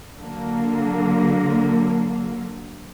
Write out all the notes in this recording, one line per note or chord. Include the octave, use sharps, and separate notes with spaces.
D3 F#3 A#3